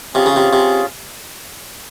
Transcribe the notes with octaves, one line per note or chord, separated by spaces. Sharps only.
C3 C#4 F4 G#4
C#3
C3
C3